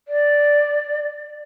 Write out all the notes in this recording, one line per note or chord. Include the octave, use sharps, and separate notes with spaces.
D5